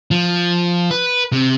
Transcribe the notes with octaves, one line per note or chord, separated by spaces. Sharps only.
F3
B4
C3